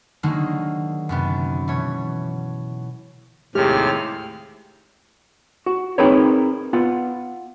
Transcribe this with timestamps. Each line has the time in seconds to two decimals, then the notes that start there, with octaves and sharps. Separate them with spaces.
0.23 D3 D#3 F#3 G#3 A#3 D#4
1.09 F#2 C3 B3
1.68 B2 E3 C#5
3.55 D#2 A2 C3 G#3 E4 G4 G#4 F6
5.66 F#4
5.98 C4 D#4 G#4 A#4 B4 C#5
6.73 B3 F4 F#5